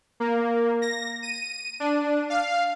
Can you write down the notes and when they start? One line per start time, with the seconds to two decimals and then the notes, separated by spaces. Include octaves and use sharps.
0.20 A#3
0.82 A#6
1.23 D#7
1.80 D4
2.30 F5